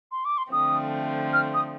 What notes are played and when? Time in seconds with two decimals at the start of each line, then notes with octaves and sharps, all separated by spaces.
0.12 C6
0.25 D6
0.38 C6
0.52 D3 F3 A3 C4 D#6
1.33 F6
1.54 D#6